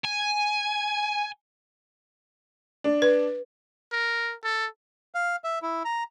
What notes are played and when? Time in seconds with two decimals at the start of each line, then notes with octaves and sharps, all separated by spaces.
0.05 G#5
2.84 D4
3.02 B4
3.92 A#4
4.44 A4
5.15 F5
5.44 E5
5.62 E4
5.85 A#5